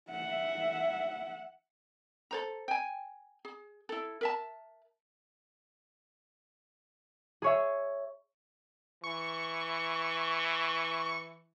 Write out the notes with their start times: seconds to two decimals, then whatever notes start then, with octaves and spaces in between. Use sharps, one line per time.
0.11 E5 F#5
2.31 A4 C5 A#5
2.68 G5 G#5
3.45 G#4
3.89 E4 A4
4.21 A#4 E5 A5
7.42 G#4 C#5 E5
9.04 E3 C#6